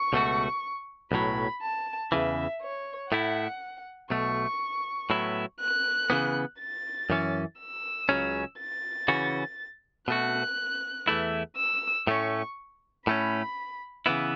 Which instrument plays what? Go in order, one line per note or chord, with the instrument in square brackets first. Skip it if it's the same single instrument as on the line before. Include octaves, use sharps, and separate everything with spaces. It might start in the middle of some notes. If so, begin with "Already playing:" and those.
Already playing: [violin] C#6
[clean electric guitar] C#2 B2 A3 F#4
[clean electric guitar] B1 A2 F#3 [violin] B5
[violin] A5
[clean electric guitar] E2 C#3 E3 [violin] E5
[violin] C#5
[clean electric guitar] A2 A3 E4 [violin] F#5
[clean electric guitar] B1 B2 A3 [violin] C#6
[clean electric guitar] A2 F#3 B3 E4
[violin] F#6
[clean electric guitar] C#3 E3 B3
[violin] A6
[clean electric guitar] F#2 E3 C#4
[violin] E6
[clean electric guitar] C#2 C#3 F#3 C#4
[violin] A6
[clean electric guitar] C#3 E3 C#4 F#4
[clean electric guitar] B2 A3 F#4 [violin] F#6
[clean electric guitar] E2 E3 A3 E4
[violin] E6
[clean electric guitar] A2 A3 C#4 [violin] C#6
[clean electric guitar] A2 A3 C#4 [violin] B5
[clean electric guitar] C#3 E3 B3 E4